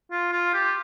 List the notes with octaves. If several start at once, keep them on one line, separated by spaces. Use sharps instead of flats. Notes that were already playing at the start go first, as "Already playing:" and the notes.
F4
F4
G4